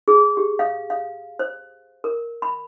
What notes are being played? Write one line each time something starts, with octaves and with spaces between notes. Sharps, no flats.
G#4
G4
F5
F5
C5
A#4
B5